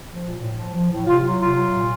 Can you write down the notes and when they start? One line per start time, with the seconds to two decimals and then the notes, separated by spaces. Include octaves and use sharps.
0.08 F3
0.24 A#2
0.41 A2
0.57 F3
0.73 F3
0.90 A2
1.06 C3 F4
1.23 F#3
1.39 C3 F4
1.55 F#3
1.72 A#2